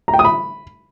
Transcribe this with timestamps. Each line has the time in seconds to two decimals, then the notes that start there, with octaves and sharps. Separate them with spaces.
0.08 A#5
0.14 G5
0.19 D#6
0.25 B5